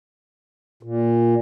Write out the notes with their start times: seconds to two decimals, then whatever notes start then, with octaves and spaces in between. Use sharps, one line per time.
0.83 A#2